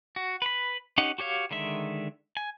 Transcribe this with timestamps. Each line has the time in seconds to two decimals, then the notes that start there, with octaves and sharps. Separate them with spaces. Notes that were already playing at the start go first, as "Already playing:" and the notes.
0.16 F#4
0.42 B4 B5
0.98 C#4 D#4 G4 F#5
1.18 F#4 G4 C#5 F5
1.51 D3 D#3 G#3 E5
2.37 G#5